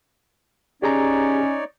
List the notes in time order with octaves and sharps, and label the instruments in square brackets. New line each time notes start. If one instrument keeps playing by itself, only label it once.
[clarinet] C#4 [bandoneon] D#4 C#5 D5 [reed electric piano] G4 G#4 A#5